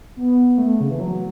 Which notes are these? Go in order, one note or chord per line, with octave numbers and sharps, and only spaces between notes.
B3
A3
C#3
E3
F#3